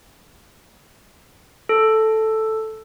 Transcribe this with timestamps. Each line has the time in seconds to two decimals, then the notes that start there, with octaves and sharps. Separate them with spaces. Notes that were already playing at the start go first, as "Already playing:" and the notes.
1.69 A4